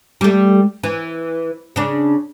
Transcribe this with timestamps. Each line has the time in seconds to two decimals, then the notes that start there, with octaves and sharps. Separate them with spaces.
0.21 G3 A3
0.83 E3
1.76 C#3 D4